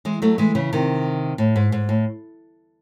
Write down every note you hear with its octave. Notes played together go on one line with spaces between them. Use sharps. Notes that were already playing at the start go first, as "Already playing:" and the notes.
E3 G#3
F#3 A3
E3 G#3
C#3 E3
C3 D#3
A2
G#2
G#2
A2